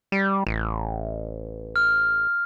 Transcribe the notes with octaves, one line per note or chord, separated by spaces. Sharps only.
G3
A1
F6